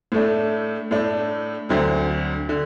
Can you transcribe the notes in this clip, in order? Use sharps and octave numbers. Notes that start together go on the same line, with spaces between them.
A2 A3 D4
A2 A3 D4
D2 D3 F#3 C4
D3